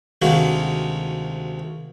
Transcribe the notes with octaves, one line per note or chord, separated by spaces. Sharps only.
D2 C3 D#3 G#3 F#4 F5